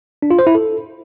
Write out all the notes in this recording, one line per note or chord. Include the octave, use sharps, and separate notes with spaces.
D4
F4
C5
E4
A4